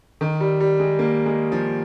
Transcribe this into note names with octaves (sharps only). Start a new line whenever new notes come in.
D#3
G3
G3
G#3
A#3
G#3
F3